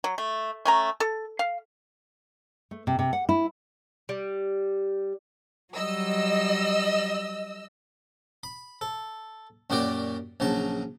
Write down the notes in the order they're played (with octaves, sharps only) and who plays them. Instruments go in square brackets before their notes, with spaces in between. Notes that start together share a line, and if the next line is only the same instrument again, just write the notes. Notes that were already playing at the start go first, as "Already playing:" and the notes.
[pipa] F#3
A3
A3 C#4 A#5
A4
F5
[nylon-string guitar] A3
C3
C3
F#5
E4
[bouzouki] G3
[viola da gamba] F#3 G3 [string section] D#5 E6
[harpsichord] B5
A4
F#2 A#2 F#4 G4 D5
A#1 C#3 F#3 A5